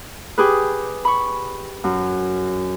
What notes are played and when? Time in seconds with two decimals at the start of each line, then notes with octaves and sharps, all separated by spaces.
0.38 G4 G#4 B4
1.05 B5 C#6
1.84 F#2